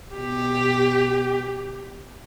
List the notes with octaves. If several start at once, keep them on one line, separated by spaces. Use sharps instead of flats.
B2 G4